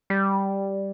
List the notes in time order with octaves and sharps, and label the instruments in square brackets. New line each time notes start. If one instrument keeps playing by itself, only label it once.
[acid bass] G3